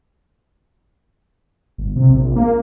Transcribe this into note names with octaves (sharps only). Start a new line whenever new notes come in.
G1
C3
A#1
A#3